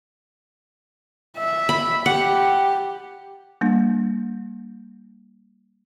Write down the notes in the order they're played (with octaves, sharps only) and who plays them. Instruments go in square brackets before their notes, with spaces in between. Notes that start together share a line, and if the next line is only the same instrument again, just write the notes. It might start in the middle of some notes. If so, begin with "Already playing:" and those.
[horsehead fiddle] E5
[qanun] B5
[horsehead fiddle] G4 [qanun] F#5
[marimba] G3 A#3 D4